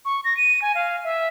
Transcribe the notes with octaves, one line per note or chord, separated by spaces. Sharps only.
C#6
A#6
D#7
G#5
F5
E5